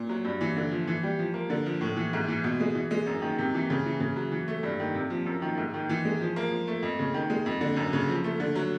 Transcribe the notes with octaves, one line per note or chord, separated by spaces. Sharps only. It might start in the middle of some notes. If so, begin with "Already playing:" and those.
Already playing: A#2
F#3
G2
E3
D3
F3
E3
G3
F3
A#3
D3
F3
A2
E3
G#2
E3
B2
G#3
E3
G#3
F#2
D#3
C3
E3
C#3
E3
C#3
F#3
E3
A3
G2
D#3
C3
F3
F#2
D#3
G#2
D#3
E3
G#3
F3
A#3
F3
A3
F2
C#3
D#3
G#3
F2
D3
F#2
C#3
F3
A3
D3
F#3